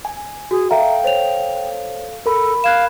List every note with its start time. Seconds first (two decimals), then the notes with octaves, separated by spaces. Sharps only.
0.05 G#5
0.51 F#4 G#4
0.71 A4 E5 F5 G5 A#5
1.04 C5 C#5 F7
2.26 A4 A#4 B5
2.64 F5 F#6 G#6 E7